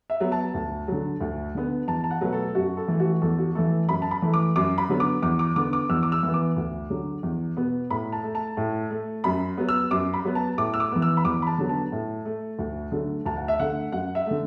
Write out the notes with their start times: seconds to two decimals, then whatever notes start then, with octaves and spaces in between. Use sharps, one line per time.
0.10 E5
0.20 F#3 B3
0.32 A5
0.54 D2
0.88 D3 F#3
1.21 D2
1.55 D3 B3
1.88 E2 A5
2.04 A5
2.11 F#5
2.21 B2 F#3 A3 B4
2.33 A4
2.55 F#2 F#4
2.77 A4
2.88 E3 A3
3.00 F#4
3.22 E2 A4
3.38 F#4
3.55 E3 A3 A4
3.89 F#2 B5
4.02 A5
4.11 B5
4.22 E3 A3
4.34 D6
4.56 F#2 D6
4.78 B5
4.89 D3 F#3 B3
5.00 D6
5.23 E2 D6
5.39 D6
5.56 D3 B3 D6
5.73 D6
5.90 E2 E6
6.03 D6
6.12 E6
6.23 E3 B3
6.34 D6
6.57 D2
6.90 D3 F#3
7.23 E2
7.57 B2 B3
7.90 A2 B5
8.12 A5
8.23 A3
8.35 A5
8.57 A2
8.90 A3
9.24 F#2 B5
9.57 F#3 B3
9.69 E6
9.91 F#2 D6
10.14 B5
10.25 F#3 B3
10.35 A5
10.58 A2 D6
10.74 E6
10.80 D6
10.91 E3 B3
11.02 E6
11.17 B5
11.25 E2 D6
11.42 B5
11.47 A5
11.58 D3 F#3 B3
11.69 A5
11.92 A2
12.25 A3
12.59 D2
12.92 D3 F#3 A3
13.26 D2 A5
13.37 F#5
13.48 E5
13.59 D3 A3 F#5
13.92 F#2 F#5
14.15 E5
14.26 D3 A3